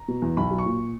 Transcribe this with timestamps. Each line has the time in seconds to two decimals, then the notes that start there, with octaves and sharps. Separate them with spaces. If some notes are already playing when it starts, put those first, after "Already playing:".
Already playing: A#5
0.08 B2
0.22 E2
0.37 B1 B5
0.51 F#3
0.58 C#6
0.66 A#2